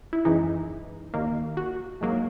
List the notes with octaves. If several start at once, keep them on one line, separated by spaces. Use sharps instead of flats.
E4
F#2 E3 G#3 D#4
D#2 D#3 A#3
F#4
G#2 F#3 A#3